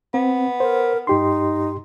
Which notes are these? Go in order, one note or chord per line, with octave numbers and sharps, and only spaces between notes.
B3 C4
A#4 C5
G2 D#4 G4 C6